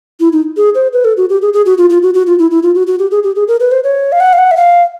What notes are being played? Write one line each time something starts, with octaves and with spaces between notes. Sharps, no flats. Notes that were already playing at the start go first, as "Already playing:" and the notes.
E4
D#4
G#4
C5
B4
A4
F#4
G4
G#4
G#4
F#4
F4
F4
F#4
F#4
F4
E4
E4
F4
F#4
F#4
G4
G#4
G4
G#4
A#4
B4
C5
C#5
F5
F#5
F5
F#5
E5
F5